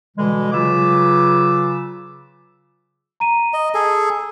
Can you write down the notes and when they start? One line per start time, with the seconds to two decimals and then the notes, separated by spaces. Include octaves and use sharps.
0.17 B2 D3 E3 G3 G#3
0.52 C#3 F#3 F4 B4 D6 E6
3.20 A#5 D#7
3.54 D#5
3.74 G#4 A4